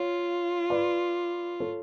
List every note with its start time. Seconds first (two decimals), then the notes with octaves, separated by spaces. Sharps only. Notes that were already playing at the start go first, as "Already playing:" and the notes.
Already playing: F4 C#5 F5
0.70 B4 D5
1.60 A4 C#5